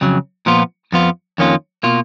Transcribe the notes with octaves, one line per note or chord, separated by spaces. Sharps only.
F2 C#3 F#3
A#2 F3 B3 F4
F2 F3 B3 F4
F2 D#3 A#3 C#4 F4
B2 A#3 F4